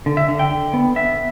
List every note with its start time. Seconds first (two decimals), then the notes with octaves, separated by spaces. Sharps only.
0.06 D3
0.17 E5
0.28 D3
0.39 G5
0.51 D3
0.73 B3
0.96 B3 E5